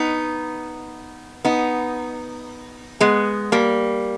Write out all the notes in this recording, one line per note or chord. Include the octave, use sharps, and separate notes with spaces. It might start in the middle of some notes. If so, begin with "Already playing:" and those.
Already playing: B3 D#4
B3 D#4
G#3 B3
G3 A#3